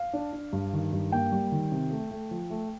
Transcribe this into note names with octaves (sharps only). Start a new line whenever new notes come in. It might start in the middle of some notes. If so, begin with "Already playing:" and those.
Already playing: F5
D4
D4
G2
D#3
G2
A#3 G5
G3
D#3
C3
A3
A3
F3
A3